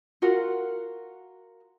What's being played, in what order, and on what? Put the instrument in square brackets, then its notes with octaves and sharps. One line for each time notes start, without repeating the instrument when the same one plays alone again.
[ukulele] F4 F#4 A#4 F#5